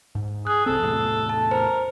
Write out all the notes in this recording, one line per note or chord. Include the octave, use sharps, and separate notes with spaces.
G#2
G#4 F#6
C2 C4 A4
E2 A2 C3
A5
A#4 C5